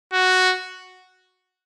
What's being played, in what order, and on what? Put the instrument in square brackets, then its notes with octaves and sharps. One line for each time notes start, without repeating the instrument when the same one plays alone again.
[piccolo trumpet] F#4